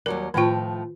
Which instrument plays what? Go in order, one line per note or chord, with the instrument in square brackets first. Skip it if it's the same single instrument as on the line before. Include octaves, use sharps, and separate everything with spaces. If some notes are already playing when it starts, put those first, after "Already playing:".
[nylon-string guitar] D#2 F#3 G3 [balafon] A#4
[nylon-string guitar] A2 F3 G5 [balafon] D#3 F4